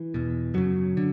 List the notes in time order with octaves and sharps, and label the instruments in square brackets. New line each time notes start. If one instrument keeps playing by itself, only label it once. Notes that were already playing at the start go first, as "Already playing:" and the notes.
Already playing: [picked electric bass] E3
E2 B2
F#2 C#3 F#3
D3